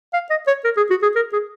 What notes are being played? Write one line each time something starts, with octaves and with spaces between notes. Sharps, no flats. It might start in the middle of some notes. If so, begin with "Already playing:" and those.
F5
D#5
C#5
A#4
G#4
F#4
G#4
A#4
G#4